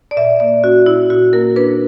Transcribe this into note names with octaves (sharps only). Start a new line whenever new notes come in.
D5
A#2 E5
A#3 D5
C#4 F#4
A#2 E4
A#2 F#4
A#3 A#4
D4 B4